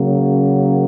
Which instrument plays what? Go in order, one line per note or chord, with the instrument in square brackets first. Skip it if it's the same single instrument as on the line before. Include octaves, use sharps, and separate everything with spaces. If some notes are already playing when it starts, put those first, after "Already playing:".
Already playing: [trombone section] C#3 F#3 A#3